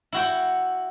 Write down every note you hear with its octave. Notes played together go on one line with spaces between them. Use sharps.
E4 F#4 G5